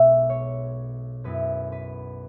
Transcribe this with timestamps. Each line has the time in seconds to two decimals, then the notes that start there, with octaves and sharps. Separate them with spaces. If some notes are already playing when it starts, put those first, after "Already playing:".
Already playing: B1 B2 G#3 E5
0.29 C#5
1.24 F#2 F#3 B3 E4 B4
1.72 B4